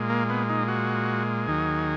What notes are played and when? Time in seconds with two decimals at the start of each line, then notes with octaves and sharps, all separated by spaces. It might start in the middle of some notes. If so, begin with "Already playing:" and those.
Already playing: A#2 G#3
0.10 A#3
0.30 B3
0.49 D#4
0.68 F#4
1.47 D#2 D#3 F#3 G#4